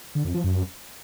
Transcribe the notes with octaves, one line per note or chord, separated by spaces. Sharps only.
D3
F2
F3
F#2